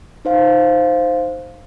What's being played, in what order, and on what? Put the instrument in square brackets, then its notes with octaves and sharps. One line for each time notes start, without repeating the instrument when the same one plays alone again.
[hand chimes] D#4 C5 F5